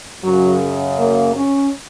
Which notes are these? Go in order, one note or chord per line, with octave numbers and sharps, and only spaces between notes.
F#2 C#3 F#3
A#3
C#4